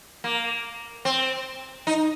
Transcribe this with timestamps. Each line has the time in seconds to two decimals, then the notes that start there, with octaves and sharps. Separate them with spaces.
0.24 A#3
1.05 C4
1.87 D#4